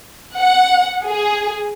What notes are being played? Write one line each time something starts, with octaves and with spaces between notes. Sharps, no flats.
F#5
G#4